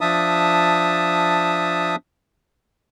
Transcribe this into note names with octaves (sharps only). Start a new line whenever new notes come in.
F3 D4 E5 A5 D#6